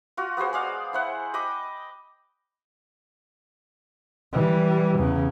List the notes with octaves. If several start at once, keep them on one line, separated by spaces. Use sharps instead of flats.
F4 F#4
B3 F#4 G#4 C5
G#3 D5 F5
E4 C5 F#5
D#5 G5 B5 D6
E3 G3
E2 C#3